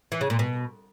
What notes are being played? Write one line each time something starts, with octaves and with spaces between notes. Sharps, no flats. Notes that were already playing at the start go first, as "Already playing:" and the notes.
E3
C#3
A#2
B2